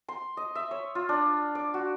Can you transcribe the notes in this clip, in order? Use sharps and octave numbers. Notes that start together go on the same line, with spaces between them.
C6
D#5
E5
C#5
F4
D4
D5
F#4